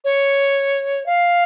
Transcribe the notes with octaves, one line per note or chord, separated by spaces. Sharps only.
C#5
F5